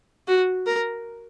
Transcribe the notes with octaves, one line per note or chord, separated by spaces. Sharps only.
F#4
A#4